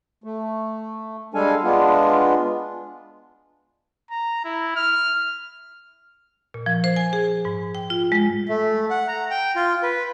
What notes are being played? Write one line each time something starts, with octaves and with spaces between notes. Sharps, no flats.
A3
G3 G#3 D4 A4 F5 G#5
G#3 B3 D4 F4
A#5
E4
F6
A#2
F3
C5
G#5
G#4
G#2
G5
F4
G#3
A3
F#5
A#5
G5
F4
B4